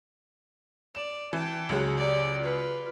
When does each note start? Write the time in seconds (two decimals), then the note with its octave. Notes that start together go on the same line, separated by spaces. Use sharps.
0.95 D5 E7
1.33 E3 G5 A5
1.69 C#2 F#3 G#3
1.98 G4 D5
2.41 F4 B4